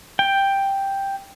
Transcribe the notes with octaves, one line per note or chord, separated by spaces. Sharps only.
G5